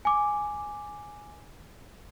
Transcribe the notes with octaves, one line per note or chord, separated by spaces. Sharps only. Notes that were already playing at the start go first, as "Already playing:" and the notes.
G#5 D6